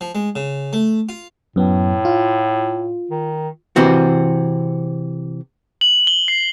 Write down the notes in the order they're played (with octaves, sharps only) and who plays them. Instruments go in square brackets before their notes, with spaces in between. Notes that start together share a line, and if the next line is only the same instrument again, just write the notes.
[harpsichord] F3
G#3
C#3
A3
F4
[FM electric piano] F#2 B3 [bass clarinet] A2
[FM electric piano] F4
[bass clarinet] D#3
[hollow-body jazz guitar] C3 E3 C4 F#4
[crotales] F#7
G7
C7